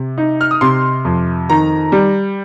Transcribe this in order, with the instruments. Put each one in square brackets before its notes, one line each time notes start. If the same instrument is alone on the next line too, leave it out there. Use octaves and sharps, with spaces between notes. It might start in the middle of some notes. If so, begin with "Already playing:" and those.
Already playing: [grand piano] C3
D#4
F6
D#6
C3 C6
F2
D#3 A#5
G3